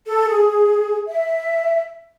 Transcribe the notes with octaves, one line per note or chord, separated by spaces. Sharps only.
A4
G#4
E5